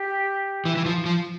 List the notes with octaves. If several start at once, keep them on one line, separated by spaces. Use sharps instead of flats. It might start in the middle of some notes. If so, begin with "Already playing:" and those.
Already playing: G4
E3
E3
F3
F3